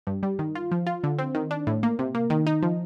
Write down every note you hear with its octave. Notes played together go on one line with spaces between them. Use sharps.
G2
G3
D#3
F4
F3
F4
D3
C4
D#3
D4
A2
A#3
C3
A#3
D#3
D#4
F3